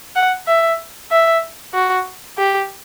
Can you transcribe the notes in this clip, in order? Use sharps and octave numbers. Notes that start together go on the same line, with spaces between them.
F#5
E5
E5
F#4
G4